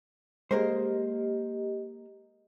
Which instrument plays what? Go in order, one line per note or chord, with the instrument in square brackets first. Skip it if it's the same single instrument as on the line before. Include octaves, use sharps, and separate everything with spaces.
[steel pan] G#3 [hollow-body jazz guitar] A#3 A#4 C5 [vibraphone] G4 D#5